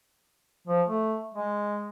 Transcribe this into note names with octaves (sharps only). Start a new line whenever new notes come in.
F3
A3
G#3